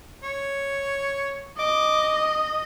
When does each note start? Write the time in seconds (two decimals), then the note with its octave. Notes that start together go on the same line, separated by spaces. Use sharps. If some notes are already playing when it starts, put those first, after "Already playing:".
0.23 C#5
1.59 D#5 D6